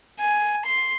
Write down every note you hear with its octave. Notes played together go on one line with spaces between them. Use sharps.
G#5
C6